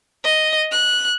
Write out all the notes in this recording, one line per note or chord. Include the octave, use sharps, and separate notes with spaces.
D#5
F#6